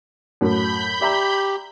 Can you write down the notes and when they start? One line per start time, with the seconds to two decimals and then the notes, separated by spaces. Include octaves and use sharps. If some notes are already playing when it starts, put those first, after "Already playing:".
0.41 F#2 A2 F#3 B5 G6
1.01 G4 D5 E5 A#5